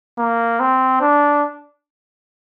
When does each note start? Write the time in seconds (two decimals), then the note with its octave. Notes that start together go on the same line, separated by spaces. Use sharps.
0.18 A#3
0.60 C4
1.01 D4